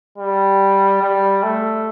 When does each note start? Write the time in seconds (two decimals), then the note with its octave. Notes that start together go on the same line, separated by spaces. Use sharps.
0.18 G3
1.01 G3
1.43 A3